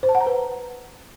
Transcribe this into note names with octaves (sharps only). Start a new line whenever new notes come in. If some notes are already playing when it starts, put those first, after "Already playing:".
C5
A5
F#5
A#5
B4